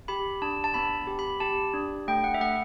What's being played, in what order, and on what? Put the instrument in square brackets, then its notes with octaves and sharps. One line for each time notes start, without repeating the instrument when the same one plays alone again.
[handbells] G4 B5
D4 A5
A5
B3 B5
G4
B5
G4 A5
D4
A3 G5
F#5
E5
A3 F#5